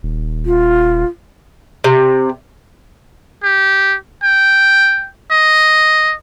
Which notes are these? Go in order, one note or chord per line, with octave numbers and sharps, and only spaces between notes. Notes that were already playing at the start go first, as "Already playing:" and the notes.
D#1
F4
C3
G4
G5
D#5